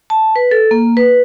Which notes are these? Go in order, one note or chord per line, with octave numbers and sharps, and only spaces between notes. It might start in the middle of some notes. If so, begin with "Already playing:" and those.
A5
B4
A4
A#3
B4